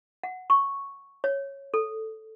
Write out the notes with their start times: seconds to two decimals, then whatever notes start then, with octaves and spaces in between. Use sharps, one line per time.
0.23 F#5
0.50 C#6
1.24 C#5
1.74 A4